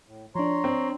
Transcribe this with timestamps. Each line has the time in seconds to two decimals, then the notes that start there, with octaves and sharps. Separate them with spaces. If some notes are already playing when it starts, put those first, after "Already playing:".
0.07 A2
0.35 F3 D4 C#5 A#5 C6
0.64 C4